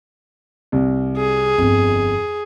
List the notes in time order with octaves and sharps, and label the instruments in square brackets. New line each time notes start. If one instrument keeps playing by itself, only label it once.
[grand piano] C2
[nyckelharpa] G#4
[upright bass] G1 B3 [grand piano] F2